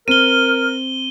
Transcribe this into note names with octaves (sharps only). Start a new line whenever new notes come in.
C4 A#4 F6 D#7 G7